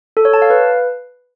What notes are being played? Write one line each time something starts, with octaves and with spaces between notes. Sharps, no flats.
A4
C#5
A5
F5
B4